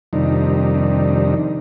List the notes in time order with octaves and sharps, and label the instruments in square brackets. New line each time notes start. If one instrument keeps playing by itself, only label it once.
[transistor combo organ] F2 C3 D#3 G3 D4 D#4